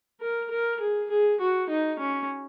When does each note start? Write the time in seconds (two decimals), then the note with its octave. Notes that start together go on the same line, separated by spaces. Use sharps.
0.21 A#4
0.50 A#4
0.80 G#4
1.10 G#4
1.40 F#4
1.69 D#4
1.99 C#4